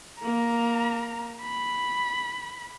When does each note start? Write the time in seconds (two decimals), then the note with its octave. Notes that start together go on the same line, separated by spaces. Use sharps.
0.19 A#3 A#5
1.42 B5